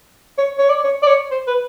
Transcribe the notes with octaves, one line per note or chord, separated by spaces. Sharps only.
C#5
C#5
D5
C#5
D5
C#5
C5
B4